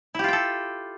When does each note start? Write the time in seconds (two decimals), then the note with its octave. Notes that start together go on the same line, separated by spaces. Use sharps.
0.15 E4
0.19 G4
0.24 F4
0.28 G5
0.33 A4